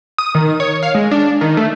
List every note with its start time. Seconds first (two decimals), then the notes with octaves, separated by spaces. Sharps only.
0.18 D#6
0.35 D#3
0.60 C#5
0.83 F5
0.95 G#3
1.11 D4
1.41 D#3
1.57 A3